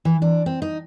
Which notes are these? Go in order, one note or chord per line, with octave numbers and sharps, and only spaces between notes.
E3
D4
C4
D#4